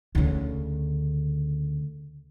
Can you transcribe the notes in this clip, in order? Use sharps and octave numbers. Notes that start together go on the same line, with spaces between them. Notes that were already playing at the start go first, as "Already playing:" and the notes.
D2 C#3